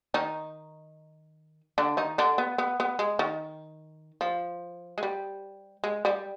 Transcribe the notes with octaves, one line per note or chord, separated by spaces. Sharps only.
D#3 D#4
D3 D4
D#3 D#4
D3 D4
B3
B3
B3
G#3
D#3
F3
G#3
G3
G#3
G3